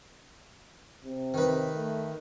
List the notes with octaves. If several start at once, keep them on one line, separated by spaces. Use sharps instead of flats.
C3
D#3 B4
A3